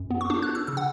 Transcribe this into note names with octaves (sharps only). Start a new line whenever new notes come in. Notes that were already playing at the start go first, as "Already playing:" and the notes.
Already playing: F#2
B3
C#6
D4 D6
F#6
D4
E6
C#3 E6
F#5